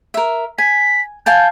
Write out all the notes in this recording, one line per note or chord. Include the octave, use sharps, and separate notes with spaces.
A#4 E5
G#5 B6
F5 G#5 A5 G6